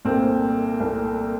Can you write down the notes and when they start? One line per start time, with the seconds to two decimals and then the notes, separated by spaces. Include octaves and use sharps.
0.05 C2 A#2 A3 C4
0.80 C2 A#2 A3